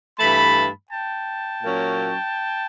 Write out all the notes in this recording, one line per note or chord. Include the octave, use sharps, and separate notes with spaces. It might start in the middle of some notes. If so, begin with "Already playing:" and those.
G2 E3 A3 A5 B5
G5 A5
A#2 F#3 A#3 C#4